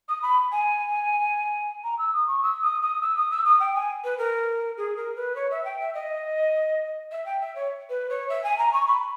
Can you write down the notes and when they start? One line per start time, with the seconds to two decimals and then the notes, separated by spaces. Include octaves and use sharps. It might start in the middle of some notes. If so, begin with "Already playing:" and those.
0.08 D#6
0.22 B5
0.51 G#5
1.83 A#5
1.98 E6
2.13 D#6
2.27 C#6
2.43 E6
2.62 D#6
2.81 D#6
3.01 E6
3.15 D#6
3.31 E6
3.45 D#6
3.60 G5
3.74 G#5
4.04 B4
4.18 A#4
4.77 G#4
4.96 A#4
5.16 B4
5.35 C#5
5.50 E5
5.64 G5
5.79 E5
5.94 D#5
7.11 E5
7.25 G5
7.41 E5
7.55 C#5
7.89 B4
8.09 C#5
8.29 E5
8.43 G#5
8.58 A#5
8.73 C#6
8.87 B5